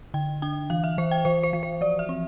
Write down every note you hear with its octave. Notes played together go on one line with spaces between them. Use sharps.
D3 G5
D4 G5
E3 F5
E5
E3 C5
G5
E3 C5
C5
E3
C5
F3 D5
E5
C4